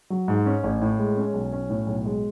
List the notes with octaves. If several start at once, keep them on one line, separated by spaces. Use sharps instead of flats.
F#3
G#2
C#4
A1
A2
G#3
C#4
B1
C#4
A2
B1
G#3